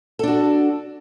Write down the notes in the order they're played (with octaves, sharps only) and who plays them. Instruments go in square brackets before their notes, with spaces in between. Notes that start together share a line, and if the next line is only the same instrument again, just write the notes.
[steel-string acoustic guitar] A4
D4
F#4